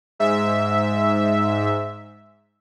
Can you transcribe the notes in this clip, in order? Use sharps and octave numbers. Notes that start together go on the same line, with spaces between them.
G#2 E5